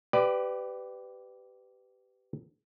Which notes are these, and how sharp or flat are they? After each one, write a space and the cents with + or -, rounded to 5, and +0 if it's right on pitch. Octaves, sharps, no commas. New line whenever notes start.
G4 -15 B4 +20 D5 +15